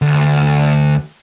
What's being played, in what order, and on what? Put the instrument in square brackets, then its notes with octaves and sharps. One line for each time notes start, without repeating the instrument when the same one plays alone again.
[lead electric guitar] D2